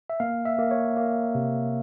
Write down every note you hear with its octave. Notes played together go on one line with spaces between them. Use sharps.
E5
A#3 F5
E5
A#3
C#5
A#3
C3